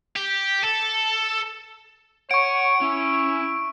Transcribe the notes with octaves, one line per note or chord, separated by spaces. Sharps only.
G4
A4
C#5 F#5 C#6 D7
C#4 E4